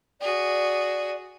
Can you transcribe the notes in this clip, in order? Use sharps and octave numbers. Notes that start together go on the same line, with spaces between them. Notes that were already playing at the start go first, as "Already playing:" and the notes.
F#4 G#4 D5